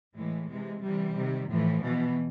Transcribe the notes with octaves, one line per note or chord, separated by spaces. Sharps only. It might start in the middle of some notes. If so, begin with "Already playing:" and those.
A2 E3 G#3
C3 E3 G#3
C3 E3 G3
C3 D#3
A2 E3 F3
B2 E3